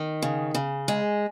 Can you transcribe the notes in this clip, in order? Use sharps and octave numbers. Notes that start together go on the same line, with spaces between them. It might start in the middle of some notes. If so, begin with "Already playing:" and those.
Already playing: D#3
C#3
C#3
G#3